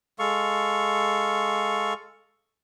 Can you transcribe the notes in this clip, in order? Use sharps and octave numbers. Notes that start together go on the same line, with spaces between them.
G#3 A4 F5 C#6